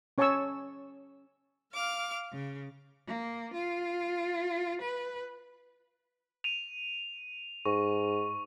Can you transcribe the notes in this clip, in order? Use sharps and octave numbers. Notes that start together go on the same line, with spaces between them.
C#4 C#5 G#5 A5 C#6 E6
F5 D6 F6
C#3
A#3
F4
B4
D#7 F7
G#2 C#6